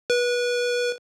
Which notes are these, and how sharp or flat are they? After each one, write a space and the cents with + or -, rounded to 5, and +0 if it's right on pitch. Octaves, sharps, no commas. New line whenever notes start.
B4 -25